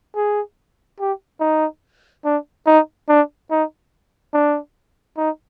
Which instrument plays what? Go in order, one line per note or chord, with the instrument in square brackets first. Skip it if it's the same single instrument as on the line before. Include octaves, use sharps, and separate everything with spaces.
[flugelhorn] G#4
G4
D#4
D4
D#4
D4
D#4
D4
D#4